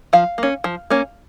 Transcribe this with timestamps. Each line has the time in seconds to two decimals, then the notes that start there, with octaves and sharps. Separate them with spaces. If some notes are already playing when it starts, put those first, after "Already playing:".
0.13 F3 F5
0.38 A#3 C#4
0.64 F3
0.90 A#3 C#4